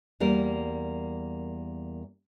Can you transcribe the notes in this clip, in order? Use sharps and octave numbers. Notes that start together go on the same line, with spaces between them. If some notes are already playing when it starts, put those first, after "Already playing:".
E2 G3 A#3 A#4